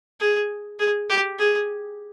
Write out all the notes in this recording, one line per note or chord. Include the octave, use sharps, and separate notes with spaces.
G#4
G#4
G4
G#4